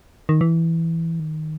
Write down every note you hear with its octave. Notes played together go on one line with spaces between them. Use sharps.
D#3
E3
D#3